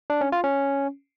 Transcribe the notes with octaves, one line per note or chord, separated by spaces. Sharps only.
D4
C#4
F4
C#4